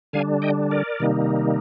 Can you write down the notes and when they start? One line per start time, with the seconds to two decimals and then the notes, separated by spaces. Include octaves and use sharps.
0.13 D3 G3 D4 F5 G#5
0.42 D#5 G5
0.71 A#4 D5
1.00 C3 D#3 G3 A#3 D#4